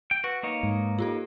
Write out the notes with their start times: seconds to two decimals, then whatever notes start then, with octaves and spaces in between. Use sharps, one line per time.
0.11 G5
0.24 F#4 B4
0.43 A#3 D#4 C#5
0.63 G#2
0.99 F4 G4 A4